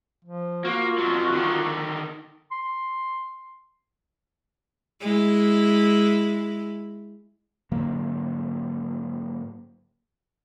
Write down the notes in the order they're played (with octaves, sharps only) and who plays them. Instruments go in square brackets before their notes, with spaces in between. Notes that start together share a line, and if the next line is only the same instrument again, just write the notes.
[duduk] F3
[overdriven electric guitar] A#3 [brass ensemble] F4 [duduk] F#4
[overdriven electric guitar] F2 F#3
D3 D#3
[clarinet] C6
[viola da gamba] G#3 E4
[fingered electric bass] G#2 D3 F#3 A#3